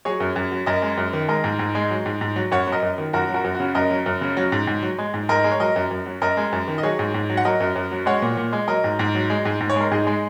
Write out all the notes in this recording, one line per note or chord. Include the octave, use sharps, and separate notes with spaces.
F#3 G#4 C#5
F#2
F#2
F#3
F#2 A#4 D#5
G#3
F#2
D#3
G#3 A#4 D#5
G#2
G#2
G#3
F#3
G#2
G#2
F#3
F#2 C#5 F#5
F#3
A#4 D#5
F#2
D#3
F#2 F#4 A#4
F#3
F#4 A#4
F#2
F#4
C#3
F#2 A#4 D#5
F#3
F#2
C#3
F#3
G#2
G#2
F#3
G#3
G#2
G#2 A#4 D#5
G#3
C#5
F#3 A#4 D#5
F#2
F#2
F#3
F#2 A#4 D#5
G#3
F#2
D#3
D#5
F#3 G#4 C#5
G#2
G#2
F#3
F#5
F#3 A#4 D#5
F#2
F#2
F#3
G#3 C#5 F#5
A#2
A#2
G#3
F#3 A#4 D#5
G#2
G#2
F#3
G#3
G#2
G#2
C#5
G#3 A#4
G#2 D#4 G#4
G#3